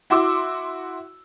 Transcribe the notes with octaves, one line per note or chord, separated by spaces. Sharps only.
E4 F#4 C6 D6 E6